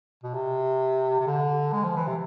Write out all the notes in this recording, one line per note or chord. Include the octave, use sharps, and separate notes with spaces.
B2
C3
C3
D3
G#3
F3
E3
C3